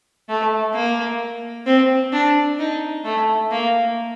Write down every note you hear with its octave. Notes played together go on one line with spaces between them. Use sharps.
A3
A#3
C4
D4
D#4
A3
A#3